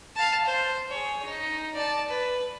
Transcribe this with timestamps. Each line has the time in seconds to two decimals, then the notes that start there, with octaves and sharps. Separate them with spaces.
0.16 F5 A5
0.45 C5
0.90 G#4 C#5
1.25 D#4
1.73 D5 A5
2.08 B4